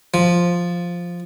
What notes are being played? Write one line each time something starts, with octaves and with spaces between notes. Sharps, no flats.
F3